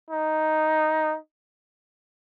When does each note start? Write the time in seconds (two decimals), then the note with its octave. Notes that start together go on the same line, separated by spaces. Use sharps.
0.11 D#4